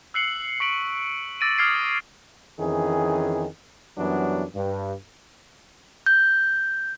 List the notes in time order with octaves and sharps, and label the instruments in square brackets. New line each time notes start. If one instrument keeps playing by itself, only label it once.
[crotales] E6 F#6 C7 C#7 F#7
C#6 B6 C7 D7 F#7
D6 E6 A6 A#6 D7 D#7
D6 D#6 F6 G#6 C7 D7
[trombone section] F2 D#3 E3 C#4 G#4
F#2 E3 F#3 G3 B3 D4
G2
[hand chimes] G6